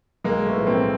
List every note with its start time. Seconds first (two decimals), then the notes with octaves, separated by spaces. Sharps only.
0.24 B1 G#3 A#3
0.45 A3 B3
0.57 A2 F3
0.67 A#3 C4